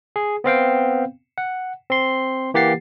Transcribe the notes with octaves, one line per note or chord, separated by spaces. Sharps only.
G#4
B3 C4 F5 G5
F#5
C4 C6
E3 A#3 G4 F#5 A6 C7